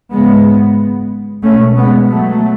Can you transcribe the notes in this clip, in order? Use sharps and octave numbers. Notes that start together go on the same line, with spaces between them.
G#1 F#2 C#3 G#3 B3
C#2 B2 A3 C#4
G#3 B3
F#3 A3